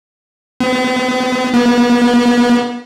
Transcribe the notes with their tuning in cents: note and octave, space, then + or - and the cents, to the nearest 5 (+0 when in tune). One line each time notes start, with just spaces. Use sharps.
B3 +45
B3 -35